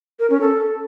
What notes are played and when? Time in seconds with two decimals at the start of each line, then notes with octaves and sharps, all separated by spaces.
0.19 A#4
0.30 C#4
0.41 A4